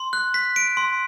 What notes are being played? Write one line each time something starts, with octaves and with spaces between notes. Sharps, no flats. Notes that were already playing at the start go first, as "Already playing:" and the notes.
Already playing: C6
F#6
B6
D7
C6